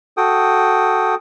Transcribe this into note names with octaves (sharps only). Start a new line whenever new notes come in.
F#4 A4 G5 D#6